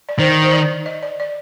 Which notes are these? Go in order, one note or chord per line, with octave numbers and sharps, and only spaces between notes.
D5
D#3 C5
C5
D5
D#5
D5
D5